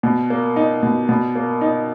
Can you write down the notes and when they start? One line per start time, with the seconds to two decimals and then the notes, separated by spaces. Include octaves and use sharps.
0.03 B2
0.30 A#3
0.56 D#4
0.83 B2
1.09 B2
1.35 A#3
1.61 D#4